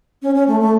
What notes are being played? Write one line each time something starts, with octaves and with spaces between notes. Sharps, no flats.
C#4
C#4
A3
A3